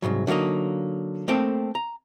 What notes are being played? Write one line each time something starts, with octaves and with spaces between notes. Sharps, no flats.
C2 F2 G#2 F#3
D3 F#3 A3 A#3 D#4
A3 A#3 C4 A4 G5
A#5